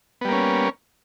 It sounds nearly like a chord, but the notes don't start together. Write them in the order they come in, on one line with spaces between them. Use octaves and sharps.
B3 G3 A#3 C#4